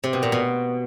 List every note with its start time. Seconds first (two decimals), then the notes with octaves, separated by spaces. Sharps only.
0.04 C3
0.13 B2
0.23 A#2
0.32 B2